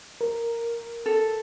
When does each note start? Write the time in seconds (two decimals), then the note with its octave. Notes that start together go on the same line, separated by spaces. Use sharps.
0.21 A#4
1.06 A4